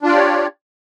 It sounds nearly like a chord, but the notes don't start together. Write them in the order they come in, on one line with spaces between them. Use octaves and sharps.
D4 F4 D5 G4 C#5